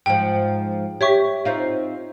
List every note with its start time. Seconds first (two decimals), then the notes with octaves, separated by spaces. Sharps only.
0.06 G#2 F3 G5
1.01 G4 C#5 E5 C#6
1.45 C4 D#4 F4